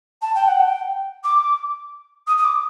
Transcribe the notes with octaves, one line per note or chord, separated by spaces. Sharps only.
A5
G5
F#5
G5
D6
D#6
D#6
D6